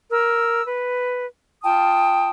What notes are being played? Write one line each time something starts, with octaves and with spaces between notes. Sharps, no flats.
A#4 E6
B4
F4 G5 A5 D#6